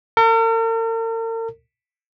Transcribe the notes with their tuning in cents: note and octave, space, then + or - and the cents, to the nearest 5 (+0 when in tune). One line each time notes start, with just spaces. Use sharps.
A#4 -45